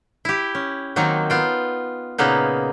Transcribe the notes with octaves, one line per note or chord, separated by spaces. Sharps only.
E4 G4
C#4
D#3 F#3 A#3 C4 D#4
B3 F4 G5
A#2 C#3 A#3 B3 D#4